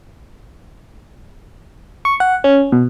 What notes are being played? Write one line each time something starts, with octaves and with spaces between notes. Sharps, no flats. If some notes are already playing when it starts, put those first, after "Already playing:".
C#6
F#5
C#4
B2